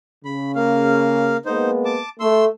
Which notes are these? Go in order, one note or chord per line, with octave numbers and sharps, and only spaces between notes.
C#3 B5
A#3 F5
G#3 A#3 B3 D#4 C5
A5 D6
A3 C6 E6